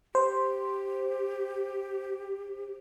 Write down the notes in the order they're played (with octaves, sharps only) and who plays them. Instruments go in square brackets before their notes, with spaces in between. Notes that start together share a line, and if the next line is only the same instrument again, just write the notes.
[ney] G4 [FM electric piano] C5